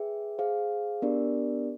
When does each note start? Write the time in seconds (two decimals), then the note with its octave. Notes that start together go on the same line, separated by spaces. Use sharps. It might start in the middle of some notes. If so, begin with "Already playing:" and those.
Already playing: G#4 B4 E5 G5
0.39 G#4 C5 F5
1.02 B3 D4 G4 A#4 D5